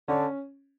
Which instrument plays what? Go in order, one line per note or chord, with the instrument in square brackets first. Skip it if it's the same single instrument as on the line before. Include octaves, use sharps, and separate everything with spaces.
[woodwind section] D3 [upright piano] C#4